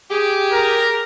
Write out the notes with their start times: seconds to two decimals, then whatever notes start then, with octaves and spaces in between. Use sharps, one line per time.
0.10 G4 G#4
0.53 A#4